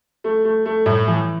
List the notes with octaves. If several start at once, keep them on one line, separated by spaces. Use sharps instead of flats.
A3
A3
A3
A2
E3